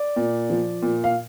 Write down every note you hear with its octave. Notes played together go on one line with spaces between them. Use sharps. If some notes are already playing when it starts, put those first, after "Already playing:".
Already playing: D5
A#2
F3
A#2
F5